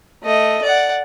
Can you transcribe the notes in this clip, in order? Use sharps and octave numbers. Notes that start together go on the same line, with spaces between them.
A3 D#5
D5 F#5